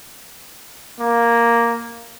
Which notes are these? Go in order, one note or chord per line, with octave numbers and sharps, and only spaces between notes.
A#3